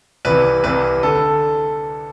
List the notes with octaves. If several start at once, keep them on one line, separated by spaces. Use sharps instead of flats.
C2 C3 E3 B4
C2 C3 E3 B4
D3 A4